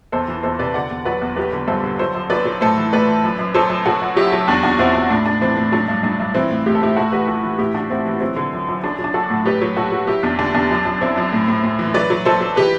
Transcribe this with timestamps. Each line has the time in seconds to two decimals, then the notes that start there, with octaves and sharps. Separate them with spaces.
0.12 E2 A4 C5
0.28 E3
0.43 E2 A4 C5
0.59 C3 B4 D5
0.74 D3 D5 F#5
0.91 E2
1.05 F#3 B4 D5
1.21 E2
1.36 F#3 G4 B4
1.52 D3
1.68 G2 A4 C5
1.84 D3
1.99 F#3 A4 C5
2.15 F#2
2.30 F#3 B4 D5
2.45 F#3
2.61 A2 A4 C5
2.77 E3
2.93 A2 B4 D5
3.07 E3
3.24 F#2
3.39 F#2
3.54 F#3 A4 C5
3.70 F#2
3.86 F#3 F#4 A4
4.02 F#2
4.16 F#3 E4 G4
4.32 F#3
4.48 E2 D4 F#4
4.63 E2 D4 F#4
4.79 E2 C4 E4
4.95 E2
5.10 A2 D4
5.26 A2 D4
5.41 E3 C4
5.57 A2
5.72 F#3 D4
5.88 G2
6.03 G2 D4
6.20 G2
6.34 E3 C4 E4
6.50 A2
6.66 A2 G4
6.75 A4
6.81 A2 E4 G4
6.96 A2 F#4 A4
7.12 E3 G4 B4
7.27 E3 F#4 A4
7.43 E3
7.58 A2 E4 G4
7.74 E3 D4 F#4
7.90 A2 C4 E4
8.06 E3
8.21 F#3 C4 E4
8.36 D3
8.53 F#2
8.69 F#2
8.84 F#3 D4
8.99 F#3
9.04 D4
9.14 F#3 F#4 A4
9.30 A2
9.45 F#3 G4 B4
9.61 F#3
9.77 F#3 F#4 A4
9.92 F#3
10.07 F#3 E4 G4
10.23 E2 D4
10.39 D3 D4
10.54 E2 D4
10.71 F#2
10.85 F#2
11.01 F#2 C4 E4
11.17 F#2
11.32 A2
11.48 A2
11.63 A2
11.79 E3
11.94 F#3 B4 D5
12.10 F#3
12.25 F#3 A4 C5
12.41 F#3
12.56 E3 G4 B4